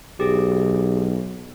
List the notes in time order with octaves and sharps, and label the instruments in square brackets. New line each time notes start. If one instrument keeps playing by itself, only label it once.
[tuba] B1 [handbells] G4 G#4